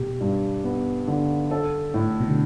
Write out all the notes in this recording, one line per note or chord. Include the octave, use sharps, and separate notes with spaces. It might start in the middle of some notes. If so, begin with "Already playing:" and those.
Already playing: B2 G4
G2
B3
D3
A4
A2
B2
D3